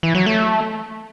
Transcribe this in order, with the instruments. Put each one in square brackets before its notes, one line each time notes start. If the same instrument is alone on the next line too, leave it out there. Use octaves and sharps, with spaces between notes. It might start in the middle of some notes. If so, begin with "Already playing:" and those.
[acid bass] E3
F#3
A3